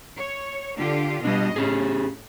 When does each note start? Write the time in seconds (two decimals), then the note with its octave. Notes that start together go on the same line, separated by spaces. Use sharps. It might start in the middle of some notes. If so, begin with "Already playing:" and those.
0.16 C#5
0.78 D3 F4 G4
1.25 B2 G3 D4 D#5
1.56 A2 C#4 G4 G#4